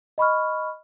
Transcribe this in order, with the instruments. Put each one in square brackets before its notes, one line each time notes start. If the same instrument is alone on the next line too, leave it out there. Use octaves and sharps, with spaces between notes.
[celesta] D#5 B5 C#6 F6